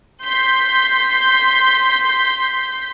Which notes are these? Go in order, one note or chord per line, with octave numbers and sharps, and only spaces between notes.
C6 G6 B6